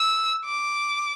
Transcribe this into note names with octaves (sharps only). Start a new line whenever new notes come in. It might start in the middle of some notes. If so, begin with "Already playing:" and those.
Already playing: E6
D6